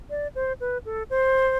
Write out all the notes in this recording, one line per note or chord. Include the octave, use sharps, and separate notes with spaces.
D5
C5
B4
A4
C5